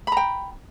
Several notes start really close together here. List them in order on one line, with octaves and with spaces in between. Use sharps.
B5 A#5 G5